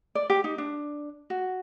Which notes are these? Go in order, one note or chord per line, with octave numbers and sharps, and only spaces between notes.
D5
G4
D#4
D4
F#4